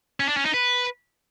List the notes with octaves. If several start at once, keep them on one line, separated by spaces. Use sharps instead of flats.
C#4
D4
C#4
D#4
B4